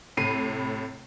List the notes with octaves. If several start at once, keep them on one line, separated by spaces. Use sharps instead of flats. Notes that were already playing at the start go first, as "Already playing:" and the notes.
A2 C3 B5 C7 D#7